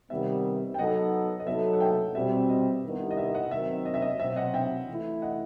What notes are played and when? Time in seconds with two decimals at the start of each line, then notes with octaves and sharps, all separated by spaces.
0.10 C3 D#3 G3 B3 E5
0.74 G5
0.78 F#3 B3 D#4 A4 D#5 F#5
1.40 D#5
1.47 F#3 B3 D#4 A4 E5
1.73 F#5
1.80 E5 G5
2.15 B2 G3 C4 E5
2.49 D#5
2.83 G2 D#3 G3 B3 E4
3.11 D#5
3.17 E5
3.35 D#5 F#5
3.51 D#3 F#3 C4 E5
3.85 D#5
3.94 E5
4.02 D#5
4.20 B2 F#3 C4 E5
4.36 D#5 F#5
4.54 E5 G5
4.88 E3 A3 E4
5.22 D#5 F#5